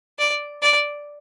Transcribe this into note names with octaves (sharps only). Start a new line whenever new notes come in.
D5
D5